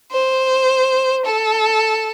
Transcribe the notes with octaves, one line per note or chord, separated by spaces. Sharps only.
C5
A4